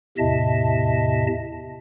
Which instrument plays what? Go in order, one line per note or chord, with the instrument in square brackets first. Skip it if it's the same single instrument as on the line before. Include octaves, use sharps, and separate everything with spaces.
[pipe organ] E2 A2 C3 D#5 E5 A5